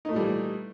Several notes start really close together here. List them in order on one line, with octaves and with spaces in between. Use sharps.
D#4 A3 A#2 G3 E3